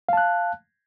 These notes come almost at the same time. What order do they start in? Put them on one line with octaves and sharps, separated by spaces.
F5 A5 F#6